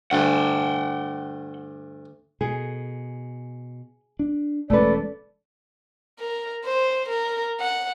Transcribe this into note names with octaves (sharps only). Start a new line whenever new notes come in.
D2 G2 G3 F#5 G5
B2 G#4
D4
E1 G#3 A3 C#4 B4 D5
A#4
C5
A#4
F#5